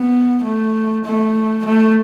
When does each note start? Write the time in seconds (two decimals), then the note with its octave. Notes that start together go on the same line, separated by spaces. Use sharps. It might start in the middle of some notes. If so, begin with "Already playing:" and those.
Already playing: B3
0.44 A3
1.05 A3
1.66 A3